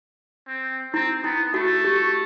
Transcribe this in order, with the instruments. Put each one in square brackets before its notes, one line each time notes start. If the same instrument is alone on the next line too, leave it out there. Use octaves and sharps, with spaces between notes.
[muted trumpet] C4
[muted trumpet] C4 [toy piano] E4
[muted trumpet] B3 [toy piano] E4
[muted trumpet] A3 [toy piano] F#4
[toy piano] G4